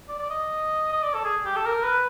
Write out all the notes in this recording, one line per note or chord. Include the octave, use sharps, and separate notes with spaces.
D5
D5
D#5
D#5
D5
A4
G#4
G4
A4
A#4
B4